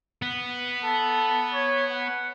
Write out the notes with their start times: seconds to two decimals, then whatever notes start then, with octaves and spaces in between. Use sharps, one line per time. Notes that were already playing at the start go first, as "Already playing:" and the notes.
0.22 B3
0.84 A4
1.54 C#5
1.91 F#5